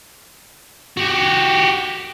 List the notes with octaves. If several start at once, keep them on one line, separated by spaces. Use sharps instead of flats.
F#4 G4